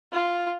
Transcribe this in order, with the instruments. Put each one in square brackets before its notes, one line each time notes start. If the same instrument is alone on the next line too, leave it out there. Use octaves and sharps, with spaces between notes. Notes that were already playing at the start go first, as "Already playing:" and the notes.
[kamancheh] F4